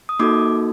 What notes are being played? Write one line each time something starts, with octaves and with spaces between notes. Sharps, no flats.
D#6
A#3 D#4 F#4 A4 D6